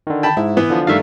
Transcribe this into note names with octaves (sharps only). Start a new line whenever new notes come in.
D3 D#3
G5 A5 B5
G#2 E4
E3 B3 E4
D3 F3
G2 D#3 A3 E5 F5